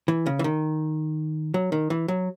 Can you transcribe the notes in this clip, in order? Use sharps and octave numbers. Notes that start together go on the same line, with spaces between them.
E3
C#3
E3
D#3
F#3
D#3
E3
F#3